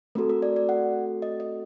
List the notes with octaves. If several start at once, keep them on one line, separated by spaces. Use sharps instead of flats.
A3 C4 F#4 A4 A#4
A#4
D5
D5
F#5
D#5
D#5